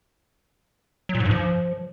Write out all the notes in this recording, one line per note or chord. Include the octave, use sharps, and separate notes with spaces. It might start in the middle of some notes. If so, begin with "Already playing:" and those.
F#3
A#2
G#2
G2
F3